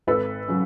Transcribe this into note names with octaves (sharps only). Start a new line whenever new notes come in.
G#1 A4 B4
C#3 F#3